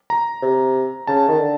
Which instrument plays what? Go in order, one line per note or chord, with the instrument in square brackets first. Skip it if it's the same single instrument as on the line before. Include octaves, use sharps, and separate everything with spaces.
[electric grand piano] A#5
[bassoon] C3
[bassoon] C#3 [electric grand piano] A5
[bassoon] D#3
D3